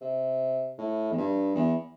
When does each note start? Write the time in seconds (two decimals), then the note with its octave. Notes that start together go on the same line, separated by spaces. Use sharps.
0.01 C3
0.78 A2
1.11 E2
1.17 G2
1.56 E2